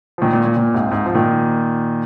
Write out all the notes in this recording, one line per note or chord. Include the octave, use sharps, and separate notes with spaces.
F3
A#2 D#3
A#2
A#2
A#2
G#2 C3
G#2
F3
A#2 D#3